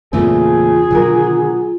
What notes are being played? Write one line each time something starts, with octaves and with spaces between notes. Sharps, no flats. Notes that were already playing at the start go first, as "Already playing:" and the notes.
E2 A#2 C#3 E3 A3 C4 F4 G#4
B2 D3 D#3 F#3 A#4